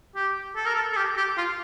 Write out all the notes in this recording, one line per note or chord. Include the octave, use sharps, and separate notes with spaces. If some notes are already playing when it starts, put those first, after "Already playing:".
G4
A4
A#4
A4
A4
G4
G4
F4